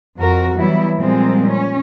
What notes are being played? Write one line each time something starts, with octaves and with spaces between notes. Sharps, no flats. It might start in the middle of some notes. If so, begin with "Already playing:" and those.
F2 F#4 A#4
E3 F#3 G3 B3 E4
A#2 F3 G3 G#3 C4
C#4